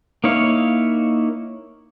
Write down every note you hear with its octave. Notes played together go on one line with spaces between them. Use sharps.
A#3 D#4 E4 C#5 F5